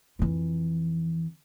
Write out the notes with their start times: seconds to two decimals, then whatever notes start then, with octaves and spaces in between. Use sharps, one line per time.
0.19 F2 E3